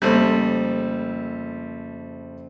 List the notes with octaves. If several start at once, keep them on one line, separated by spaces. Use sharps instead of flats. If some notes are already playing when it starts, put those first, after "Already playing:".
F2 C#3 G3 A3 A#3 C4